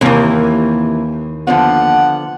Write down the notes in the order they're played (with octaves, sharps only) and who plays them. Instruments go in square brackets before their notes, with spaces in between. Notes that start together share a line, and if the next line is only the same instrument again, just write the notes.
[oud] D#2 A#3 [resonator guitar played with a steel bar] C3 E3
[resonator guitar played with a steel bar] D3 F3 B3 [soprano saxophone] F#5